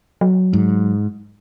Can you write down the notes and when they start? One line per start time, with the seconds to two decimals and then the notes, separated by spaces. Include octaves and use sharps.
0.21 F#3
0.53 G#2